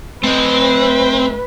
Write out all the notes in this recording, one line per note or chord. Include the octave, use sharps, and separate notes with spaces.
A3 C4 B4 D#5